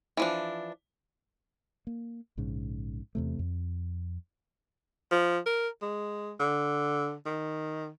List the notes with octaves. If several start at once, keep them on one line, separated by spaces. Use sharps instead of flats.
E3 F3 D4
A#3
A#1 G#2 C#3
E2 C3 A3
F2
F3
A#4
G#3
D3
D#3